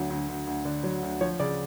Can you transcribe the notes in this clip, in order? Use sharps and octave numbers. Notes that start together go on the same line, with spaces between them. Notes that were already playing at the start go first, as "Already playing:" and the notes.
Already playing: D2 F#3
D2
D2
D2
D3
F#3
D2
F3 C#5
C#3 D5